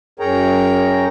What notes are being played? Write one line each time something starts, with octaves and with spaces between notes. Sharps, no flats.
F#2 G#4 A#4 C#5 G5 A#5